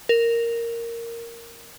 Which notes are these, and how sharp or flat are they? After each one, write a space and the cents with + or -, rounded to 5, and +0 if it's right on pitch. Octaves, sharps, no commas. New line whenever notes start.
A#4 -5